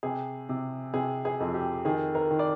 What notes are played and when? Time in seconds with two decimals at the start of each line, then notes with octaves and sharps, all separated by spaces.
0.03 C3 G#4
0.49 C3
0.94 C3 G#4
1.25 G#4
1.40 F2
1.54 G4
1.85 D#3 G#4
2.15 A#4
2.31 D#3
2.39 D5